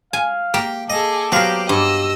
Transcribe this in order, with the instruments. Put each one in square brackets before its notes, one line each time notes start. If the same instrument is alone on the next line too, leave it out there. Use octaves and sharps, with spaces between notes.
[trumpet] F5 [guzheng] G#5
[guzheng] A#3 [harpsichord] G4
[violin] G#4 A4 [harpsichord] D#5 [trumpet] D6
[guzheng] F#3 A#4 [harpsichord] B3 C5 F5 [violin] G4
[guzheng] G2 [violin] D#5 E6